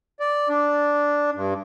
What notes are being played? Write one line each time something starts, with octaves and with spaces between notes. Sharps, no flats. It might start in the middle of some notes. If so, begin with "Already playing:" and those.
D5
D4
G2